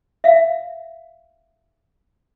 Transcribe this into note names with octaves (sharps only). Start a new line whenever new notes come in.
E5 F5